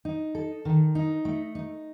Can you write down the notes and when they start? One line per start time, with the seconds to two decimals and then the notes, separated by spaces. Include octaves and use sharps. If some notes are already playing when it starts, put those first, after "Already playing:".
0.05 D#4
0.35 A4
0.65 D#3
0.95 D#4
1.25 A3
1.55 D#4